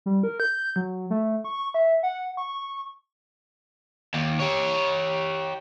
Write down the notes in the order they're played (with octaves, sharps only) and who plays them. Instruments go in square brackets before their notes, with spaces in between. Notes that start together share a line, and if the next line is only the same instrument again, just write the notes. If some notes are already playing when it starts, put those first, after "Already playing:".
[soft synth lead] G3
A#4
G6
F#3
A3
C#6
E5
F#5
C#6
[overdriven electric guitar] D#2
G4 C#5